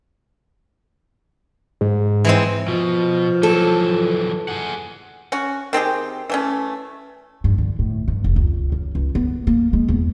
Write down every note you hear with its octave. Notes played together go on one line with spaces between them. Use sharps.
G#2
E3 G#3 C4
B2 F3
E3 F#3 A4
G#4 F#5
C#4 F#4
D#3 C4 G4 G#4
E3 A3 C#4
G2
D3
A2
G2
F1
C#2
C#3
C#2
B3
A#3
G#3
E2